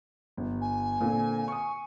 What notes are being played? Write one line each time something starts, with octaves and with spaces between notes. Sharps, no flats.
G1
G#5
A#2 D3 C4
C#6 D#6